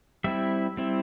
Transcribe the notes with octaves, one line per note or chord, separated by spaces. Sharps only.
G3 C4 E4 E5
G3 C4 E4